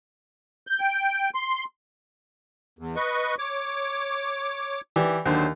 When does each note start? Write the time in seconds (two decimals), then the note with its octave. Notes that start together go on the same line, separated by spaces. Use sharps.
0.67 G6
0.80 G5
1.35 C6
2.79 E2
2.96 B4 D#5 C#6
3.39 C#5 D6
4.96 E3 G4 D5
5.26 D#2 D3 F#3 C5